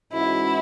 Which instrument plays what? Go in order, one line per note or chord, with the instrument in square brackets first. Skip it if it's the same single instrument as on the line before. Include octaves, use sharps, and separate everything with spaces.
[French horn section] G#2 E3 G#3 C#4 F#4 [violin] E4